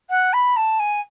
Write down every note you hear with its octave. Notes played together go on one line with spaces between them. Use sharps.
F#5
B5
A5
G#5